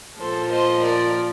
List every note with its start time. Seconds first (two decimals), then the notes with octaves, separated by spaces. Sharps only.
0.19 A#2 F3 A4 C5
0.51 C5 D#5
0.84 A#4 D5